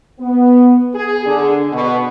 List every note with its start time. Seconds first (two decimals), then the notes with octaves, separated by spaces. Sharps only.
0.19 B3
0.94 G#4
1.26 D3
1.73 B2